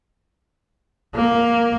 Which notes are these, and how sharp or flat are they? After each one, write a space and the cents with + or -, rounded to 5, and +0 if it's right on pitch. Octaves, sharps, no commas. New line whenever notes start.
A#3 +5